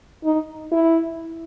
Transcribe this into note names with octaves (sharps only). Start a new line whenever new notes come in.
D#4
E4